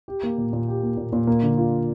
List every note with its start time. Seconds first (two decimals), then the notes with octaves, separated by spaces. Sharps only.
0.08 G4
0.23 A#3
0.38 A#2
0.53 A#2
0.68 G4
0.83 A#3
0.97 A#2
1.13 A#2
1.27 A#3
1.43 D3
1.57 F4